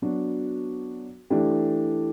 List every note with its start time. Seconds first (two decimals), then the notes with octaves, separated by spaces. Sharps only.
0.02 F#3 B3 D4 F#4
1.30 E3 A3 D4 G4